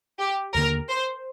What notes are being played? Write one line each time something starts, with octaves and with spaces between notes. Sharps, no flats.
G4
D#2 D3 F3 A#3 A#4
C5